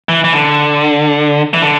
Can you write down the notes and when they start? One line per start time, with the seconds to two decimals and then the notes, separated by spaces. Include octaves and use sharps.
0.09 E3
0.24 E3
0.33 D3
1.54 E3
1.62 D3